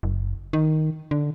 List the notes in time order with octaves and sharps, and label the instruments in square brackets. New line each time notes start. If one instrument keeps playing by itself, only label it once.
[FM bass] F#1
D#3
D3